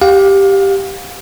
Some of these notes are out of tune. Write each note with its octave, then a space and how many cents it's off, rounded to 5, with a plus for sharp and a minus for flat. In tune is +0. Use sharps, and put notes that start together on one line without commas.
G4 +0 F5 +30